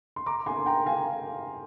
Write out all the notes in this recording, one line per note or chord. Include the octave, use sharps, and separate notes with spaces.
C6
A#5 D6
G#5 C6
G5 A#5
F5 G#5